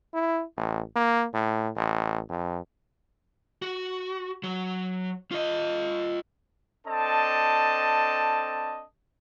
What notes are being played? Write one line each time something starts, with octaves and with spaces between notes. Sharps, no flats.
E4
A1
A#3
A2
A1
F2
F#4
F#3 F#4
F4 D#5
C4 D4 A4 D#5 A5